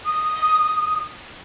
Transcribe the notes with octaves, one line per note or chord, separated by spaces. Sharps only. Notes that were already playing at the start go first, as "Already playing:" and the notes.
D#6